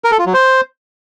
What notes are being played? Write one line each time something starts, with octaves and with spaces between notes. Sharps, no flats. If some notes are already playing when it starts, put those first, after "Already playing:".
A#4
A4
F4
F#3
C5